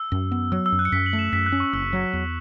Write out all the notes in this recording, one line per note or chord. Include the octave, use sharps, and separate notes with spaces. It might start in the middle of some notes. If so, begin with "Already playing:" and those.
Already playing: E6
F#2
B3
F#3 E6
E6
F#2
F#6
C#7
F#2 B6
F#7
A3
E7
F#2 B6
F#6
C#4
C#6
F#1 E6
F#3
E2